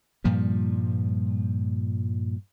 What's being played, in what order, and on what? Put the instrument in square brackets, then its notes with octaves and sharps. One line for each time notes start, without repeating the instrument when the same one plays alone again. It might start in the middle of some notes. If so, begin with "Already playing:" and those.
[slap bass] G2 A#2 F3 G3